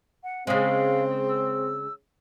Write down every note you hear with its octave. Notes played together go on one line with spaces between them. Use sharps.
F#5
C#3 G#3 C4 F5
E6